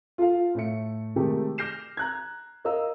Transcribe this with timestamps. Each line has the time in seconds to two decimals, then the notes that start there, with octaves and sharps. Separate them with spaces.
0.18 F4 A4 F5
0.55 A2 A3 E5 C#7
1.16 C3 D#3 G#3 A3 G4 A4
1.58 D6 F6 G6 A#6 C7 E7
1.97 A#5 F#6 G#6
2.65 A#4 D#5 F5 A#5 E6